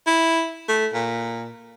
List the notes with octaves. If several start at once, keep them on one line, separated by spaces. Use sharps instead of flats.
E4
A3
A#2